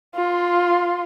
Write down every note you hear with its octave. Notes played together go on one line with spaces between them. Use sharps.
F4 C6